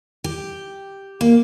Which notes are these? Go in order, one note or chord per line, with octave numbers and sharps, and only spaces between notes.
G4
A#3